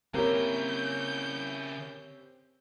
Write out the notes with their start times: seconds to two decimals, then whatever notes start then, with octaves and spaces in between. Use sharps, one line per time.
0.14 C#3 A#3 C4 E4 G4 A#4 C#5 G6